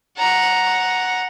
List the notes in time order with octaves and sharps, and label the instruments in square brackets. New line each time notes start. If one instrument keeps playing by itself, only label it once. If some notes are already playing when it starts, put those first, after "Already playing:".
[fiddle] F#5 A#5